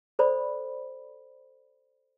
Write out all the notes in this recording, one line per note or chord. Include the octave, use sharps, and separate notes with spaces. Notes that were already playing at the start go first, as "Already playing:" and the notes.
A4 C5 D5 B5